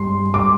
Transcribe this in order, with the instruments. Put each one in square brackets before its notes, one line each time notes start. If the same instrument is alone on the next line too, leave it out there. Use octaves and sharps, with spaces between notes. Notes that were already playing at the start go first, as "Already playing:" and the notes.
Already playing: [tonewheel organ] G2 G3 [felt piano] C6
[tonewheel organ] G3 [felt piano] D6